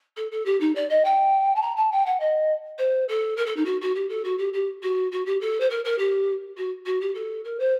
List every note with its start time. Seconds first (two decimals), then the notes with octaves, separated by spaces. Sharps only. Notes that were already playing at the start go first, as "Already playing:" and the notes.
0.16 A4
0.31 A4
0.45 G4
0.60 D#4
0.75 D5
0.89 D#5
1.04 G5
1.55 A5
1.62 A#5
1.76 A5
1.92 G5
2.06 F#5
2.20 D#5
2.78 C5
3.08 A4
3.37 A#4
3.46 A4
3.56 D#4
3.65 F#4
3.81 F#4
3.95 G4
4.09 A4
4.24 F#4
4.38 G4
4.53 G4
4.82 F#4
5.11 F#4
5.26 G4
5.40 A4
5.60 C5
5.70 A#4
5.84 A#4
5.98 G4
6.57 F#4
6.85 F#4
7.01 G4
7.14 A4
7.44 A#4
7.59 C5